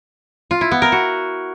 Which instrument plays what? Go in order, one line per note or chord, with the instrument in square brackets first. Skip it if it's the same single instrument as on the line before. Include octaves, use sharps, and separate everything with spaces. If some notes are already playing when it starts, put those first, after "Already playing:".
[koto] F4
E4
B3
A#4
F#4